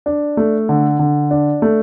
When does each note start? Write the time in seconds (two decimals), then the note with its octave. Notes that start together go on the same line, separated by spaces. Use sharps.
0.06 D4
0.37 A3
0.69 D3
0.99 D3
1.31 D4
1.62 A3